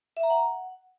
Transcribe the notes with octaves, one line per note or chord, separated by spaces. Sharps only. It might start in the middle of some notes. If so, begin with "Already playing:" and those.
E5
A#5
F#5